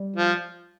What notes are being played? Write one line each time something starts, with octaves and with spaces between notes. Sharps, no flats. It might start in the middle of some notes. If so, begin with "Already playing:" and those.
Already playing: G3
F3